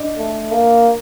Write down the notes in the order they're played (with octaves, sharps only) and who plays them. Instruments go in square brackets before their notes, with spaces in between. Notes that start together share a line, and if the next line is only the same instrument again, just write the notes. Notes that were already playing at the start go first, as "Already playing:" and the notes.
Already playing: [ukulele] D4 D#5
[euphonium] A3
A#3